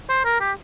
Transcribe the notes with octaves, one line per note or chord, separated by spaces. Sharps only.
C5
A#4
G4